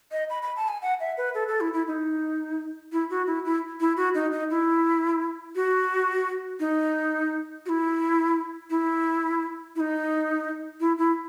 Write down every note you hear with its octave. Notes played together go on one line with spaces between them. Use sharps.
D#5
B5
B5
A5
G#5
F#5
E5
B4
A4
A4
E4
E4
D#4
E4
F#4
E4
E4
E4
F#4
D#4
D#4
E4
F#4
D#4
F#4
E4
E4
E4
D#4
E4
E4